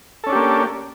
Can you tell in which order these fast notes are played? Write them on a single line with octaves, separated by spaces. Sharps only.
A4 C#4 D4 G4 A#3